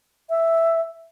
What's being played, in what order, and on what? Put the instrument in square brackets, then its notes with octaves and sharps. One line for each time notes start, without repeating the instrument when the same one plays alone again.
[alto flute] E5